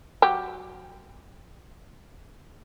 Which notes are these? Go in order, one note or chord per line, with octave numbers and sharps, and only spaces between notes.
F#3 G4